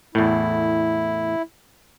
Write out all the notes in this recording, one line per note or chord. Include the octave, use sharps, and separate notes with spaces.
E2 A2 E4